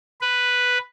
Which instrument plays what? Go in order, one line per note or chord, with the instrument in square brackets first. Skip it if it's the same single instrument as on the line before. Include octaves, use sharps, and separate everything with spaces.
[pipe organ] B4